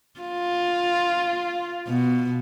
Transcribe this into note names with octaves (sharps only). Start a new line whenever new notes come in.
F4
B2